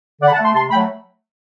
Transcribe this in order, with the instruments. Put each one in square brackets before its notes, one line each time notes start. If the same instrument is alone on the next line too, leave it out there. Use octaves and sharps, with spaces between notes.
[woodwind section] D3 D5 F#5
B5
F#5 A5
A3
A5 C6
C3 A5 C6
A3 G5 B5
F#3